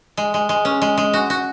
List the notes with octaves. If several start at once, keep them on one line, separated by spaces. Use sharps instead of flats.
G#3
G#3
G#3
C#4
G#3
G#3
F#4
F#4